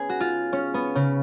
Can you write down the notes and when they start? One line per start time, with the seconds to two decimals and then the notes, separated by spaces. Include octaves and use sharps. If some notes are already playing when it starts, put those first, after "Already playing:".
Already playing: B3 C#4 G#4
0.09 F#4
0.20 F4
0.53 C#4
0.74 B3
0.95 C#3